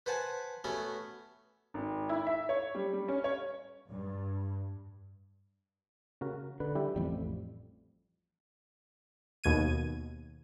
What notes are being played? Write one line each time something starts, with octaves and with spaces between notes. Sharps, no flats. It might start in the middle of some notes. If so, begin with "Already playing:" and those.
B4 C5 F#5 G#5 A5
A3 B3 C#4 F#4 B4
G#1
E4
E5
C#5
G3
G3
C#4
C#5
G2
C#3 F#4 A#4
D3 B4
G3 E4 G4
A1 F2 G3
D#2 B2 G#6 D#7